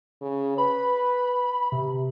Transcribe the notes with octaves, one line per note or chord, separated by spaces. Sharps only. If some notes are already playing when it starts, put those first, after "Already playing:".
C#3
B4 B5
C3